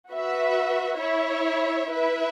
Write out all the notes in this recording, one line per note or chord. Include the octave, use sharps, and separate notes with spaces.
F#4 B4 E5
E4 C#5 E5
E4 B4 E5